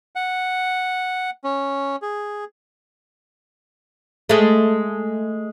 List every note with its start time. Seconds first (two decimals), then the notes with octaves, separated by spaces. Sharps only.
0.16 F#5
1.44 C#4
2.02 G#4
4.29 G#3 A3